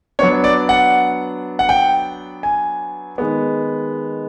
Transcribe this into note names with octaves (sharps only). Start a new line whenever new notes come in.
F#3 B3 D4 C#5
D5
F#5
F#5
G5
G#5
D#3 G#3 B3